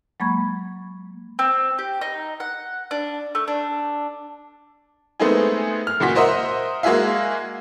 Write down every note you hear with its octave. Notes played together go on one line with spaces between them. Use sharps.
F#3 G#3 A#3 B5 C#6 G#6
C4
G4
D#4
F#5
D4
A3
D4
G#3 A3 B3 C4 D#4 G#4
F6
C#2 A#2 F#4 B6
A#4 C5 D#5 E5 F#5
G#3 A#3 F#4 G#4 E5 F5